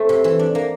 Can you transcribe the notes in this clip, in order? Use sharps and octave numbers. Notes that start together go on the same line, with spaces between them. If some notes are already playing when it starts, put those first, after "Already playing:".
Already playing: A3 C4
C3
E3
D4
A#3